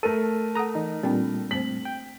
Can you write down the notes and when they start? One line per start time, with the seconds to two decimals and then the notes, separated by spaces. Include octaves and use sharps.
0.03 A3 A4 A#4 D#7
0.55 A4 F#5 A#5 D#6
0.75 E3 D#4
1.03 A#2 G3 C4 D4 G5
1.51 A3 C4 C5 B6 F#7
1.85 G5